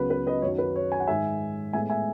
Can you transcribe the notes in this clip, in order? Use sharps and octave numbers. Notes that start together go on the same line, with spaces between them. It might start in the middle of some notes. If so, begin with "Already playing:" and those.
Already playing: C#2 C#3 F#3 B3 B4
B4
B4 D#5
F#2 D#3 F#3 C#5
B4
C#5
G#5
F#5
G#2 D#3 G#3 E5 G#5
A2 G#3 B3 E5 G#5
E5 G#5